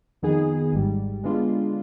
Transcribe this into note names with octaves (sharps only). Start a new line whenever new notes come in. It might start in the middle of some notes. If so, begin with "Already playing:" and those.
F2 D#3 B3 D#4 G#4
G#1 G#2 G3
D3 G#3 B3 D4 F4